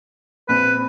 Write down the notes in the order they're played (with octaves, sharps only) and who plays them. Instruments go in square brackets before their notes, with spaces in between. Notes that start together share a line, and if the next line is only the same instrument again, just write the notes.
[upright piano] A#1 C4 [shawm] B4